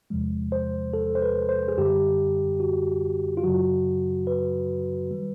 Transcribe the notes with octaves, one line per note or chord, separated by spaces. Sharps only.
E2 C3 F3 G#3
C5
A4
C5
B4
C5
G#4
F#2 D3 G3 G4
F#4
F4
F#2 C#3 F#3 F#4
B4
D#3 G3